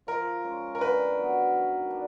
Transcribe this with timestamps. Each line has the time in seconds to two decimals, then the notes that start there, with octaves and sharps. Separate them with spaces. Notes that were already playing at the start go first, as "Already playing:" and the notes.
0.07 F3 A#4
0.44 G#3 C#4
0.75 A#4
0.81 D3 B4
1.17 F#3 B3
1.54 D#3
1.90 D4